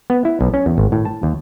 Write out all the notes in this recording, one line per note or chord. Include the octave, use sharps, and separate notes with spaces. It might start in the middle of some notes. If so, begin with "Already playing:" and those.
B3
E4
B1
C#4
E2
G#1
A2
A5
D#2